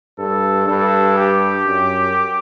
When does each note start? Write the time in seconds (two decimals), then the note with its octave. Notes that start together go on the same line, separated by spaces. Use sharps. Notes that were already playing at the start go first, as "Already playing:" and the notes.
0.18 G2 A4
0.67 G2 A4
1.17 G4
1.66 F#2